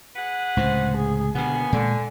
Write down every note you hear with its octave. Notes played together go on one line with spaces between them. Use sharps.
G#4 B4 F#5
C#2 A2 C3 C5
G#4
D#2 B2 D3 B3 G#5
A#2 D3 G#3